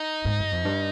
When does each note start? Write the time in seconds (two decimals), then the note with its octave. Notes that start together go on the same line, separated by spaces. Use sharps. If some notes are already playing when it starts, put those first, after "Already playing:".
Already playing: D#4
0.25 G#2
0.39 G2
0.52 F2
0.65 G2